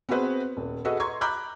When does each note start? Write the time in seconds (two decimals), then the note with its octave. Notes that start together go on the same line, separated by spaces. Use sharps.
0.09 B3 C4 F#4 G#4 B4 C5
0.57 D#1
0.85 F#4 G#4 A4 B4 D#5
1.00 A#5 C6 C#6 G#6
1.21 A#5 B5 D6 F#6 G6